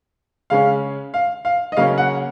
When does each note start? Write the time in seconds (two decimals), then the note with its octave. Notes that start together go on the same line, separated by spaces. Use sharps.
0.50 C#3 G#3 C#4 F5
1.14 F5
1.45 F5
1.72 D#5
1.77 C#3 F#3 A#3 C#4 F5
1.98 F#5